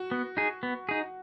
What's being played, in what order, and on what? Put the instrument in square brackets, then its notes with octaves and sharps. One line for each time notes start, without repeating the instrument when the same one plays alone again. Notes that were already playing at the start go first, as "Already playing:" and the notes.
Already playing: [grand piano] F#4
[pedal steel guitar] B3
D#4 G#4
B3
D#4 G#4